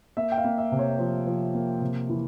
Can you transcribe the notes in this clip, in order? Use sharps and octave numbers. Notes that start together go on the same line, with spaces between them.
A#3 E5
G5
F5
A#3
E5
C3
C#5
F3 C5
F3
A#3
C3
E3